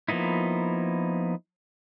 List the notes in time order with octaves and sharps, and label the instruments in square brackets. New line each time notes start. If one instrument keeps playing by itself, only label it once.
[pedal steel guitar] F3 A#3 B3 D#4 E4